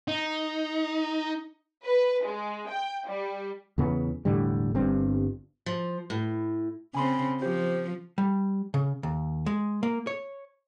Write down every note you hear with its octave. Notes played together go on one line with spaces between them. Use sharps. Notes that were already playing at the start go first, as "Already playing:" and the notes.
D#4
B4
G#3
G5
G3
E2 C#3 B3
E1 A2 D3 G3
G1 G2 C4
F3
A2
C#3 C4 G#5 B5 C6
F3 G4 C5
G3
C#3
D#2
G#3
A#3
C#5